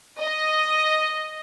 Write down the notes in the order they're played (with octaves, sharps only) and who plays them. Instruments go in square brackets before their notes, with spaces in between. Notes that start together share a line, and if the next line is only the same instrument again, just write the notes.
[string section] D#5